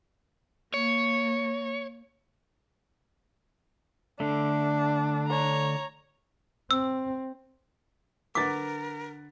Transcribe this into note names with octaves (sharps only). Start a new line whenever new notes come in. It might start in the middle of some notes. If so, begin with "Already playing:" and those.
A#3 C#5
D3 A3 D4
C#5 A#5
C4 E6
D3 A#4 B4 F#5 D6 A6 B6